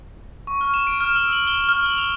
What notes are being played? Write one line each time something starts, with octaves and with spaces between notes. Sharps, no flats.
C#6
F6
E7
D7
F6
E6
F#7
G7
F6
F#7
F7